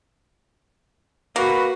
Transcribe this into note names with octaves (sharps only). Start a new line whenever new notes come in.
A#3 F#4 B4